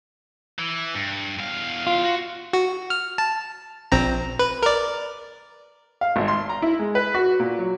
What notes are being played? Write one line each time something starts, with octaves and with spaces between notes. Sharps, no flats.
E3
G2
E2 F5
F4
F#4
F#4
F6
A5
A#1 C4 A#5
B4
A#4 D5
F5
G#1
C6
A#5
E4
G#3
B4
F#4
A#2
F#3